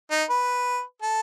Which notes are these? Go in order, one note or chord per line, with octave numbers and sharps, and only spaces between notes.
D#4
B4
A4